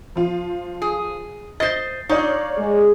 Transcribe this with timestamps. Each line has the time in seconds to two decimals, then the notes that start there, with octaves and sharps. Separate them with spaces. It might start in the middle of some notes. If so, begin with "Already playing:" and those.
0.16 F3 F4
0.82 G#4
1.60 C5 D#5 A6 C7
2.09 D#4 C#5 D5 F5
2.57 G#3 G#4